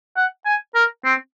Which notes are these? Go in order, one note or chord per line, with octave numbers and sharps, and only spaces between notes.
F#5
G#5
A#4
C4